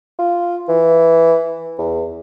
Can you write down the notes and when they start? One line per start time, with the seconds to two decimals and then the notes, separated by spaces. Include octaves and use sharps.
0.19 F4
0.69 E3
1.79 E2